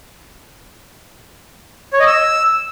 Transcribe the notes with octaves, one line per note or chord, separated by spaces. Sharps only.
C#5
D#5
E6